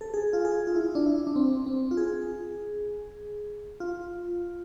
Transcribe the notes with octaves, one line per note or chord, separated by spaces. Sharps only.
A4
G#4
F4
G#4
F4
E4
D4
E4
D4
C4
C4
F4
G#4
F4